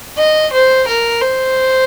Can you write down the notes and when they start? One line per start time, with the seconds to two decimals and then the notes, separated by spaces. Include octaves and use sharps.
0.18 D#5
0.53 C5
0.88 A#4
1.22 C5